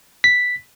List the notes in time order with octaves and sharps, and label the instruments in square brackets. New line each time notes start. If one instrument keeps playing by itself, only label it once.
[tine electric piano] B6